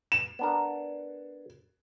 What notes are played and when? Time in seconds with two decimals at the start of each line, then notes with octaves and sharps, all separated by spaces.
0.12 E7
0.39 B3 D4 A#4